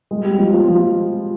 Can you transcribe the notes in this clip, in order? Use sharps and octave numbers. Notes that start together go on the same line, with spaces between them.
G#3
G3
F3
F3
F3